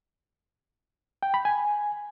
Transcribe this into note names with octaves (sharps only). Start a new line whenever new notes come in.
G5
B5
G#5